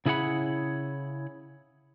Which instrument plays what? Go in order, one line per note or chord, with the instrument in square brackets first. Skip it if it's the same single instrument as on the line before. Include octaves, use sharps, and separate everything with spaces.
[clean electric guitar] C#3 E4 G#4 A#4 F#5 B5